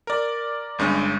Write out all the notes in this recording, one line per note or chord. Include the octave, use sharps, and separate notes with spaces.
A#4 D5
G1 G2 G#3 C#4